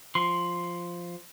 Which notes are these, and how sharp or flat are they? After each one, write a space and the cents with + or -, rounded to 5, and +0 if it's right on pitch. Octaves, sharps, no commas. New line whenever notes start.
F3 +0 C6 +0